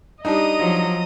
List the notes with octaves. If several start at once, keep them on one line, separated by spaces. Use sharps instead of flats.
G3 D4 D#4 D#5 A#5 D#6
F3 F#3